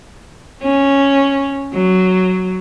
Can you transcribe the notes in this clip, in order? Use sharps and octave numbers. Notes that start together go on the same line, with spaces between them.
C#4
F#3